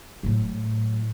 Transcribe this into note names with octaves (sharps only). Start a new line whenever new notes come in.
A2 F#3